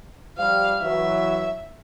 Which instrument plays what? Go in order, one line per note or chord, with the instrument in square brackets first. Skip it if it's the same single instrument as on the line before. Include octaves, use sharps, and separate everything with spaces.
[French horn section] F3 G3 [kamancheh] F5
[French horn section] E3 F#3 [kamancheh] E5